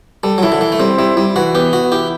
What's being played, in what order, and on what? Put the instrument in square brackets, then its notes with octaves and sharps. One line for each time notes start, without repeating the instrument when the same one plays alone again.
[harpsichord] G3 [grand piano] A4
[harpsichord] F#3
[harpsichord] E3 [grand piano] E4
[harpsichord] D3
[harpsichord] E3 [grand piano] E4
[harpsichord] A3
[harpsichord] G3 [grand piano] C4
[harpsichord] G3 [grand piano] E4
[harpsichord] G3 [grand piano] E4
[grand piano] E3 [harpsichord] F#4
[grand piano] B3 [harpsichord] G4
[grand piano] E3 [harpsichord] F#4
[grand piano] E4 [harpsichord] G4